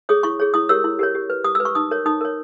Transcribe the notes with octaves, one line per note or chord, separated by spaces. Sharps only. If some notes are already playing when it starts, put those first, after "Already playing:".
G#4 C#5 D#6
E4 C#6
G#4 C#5
E4 D#6
G4 A#4 C#5 E6
E4
G4 A#4 C#5
G4
B4
G4 D#6
E6
B4
C#6
D#4 D#6
A#4 C#5
D#4 D#6
A#4 C#5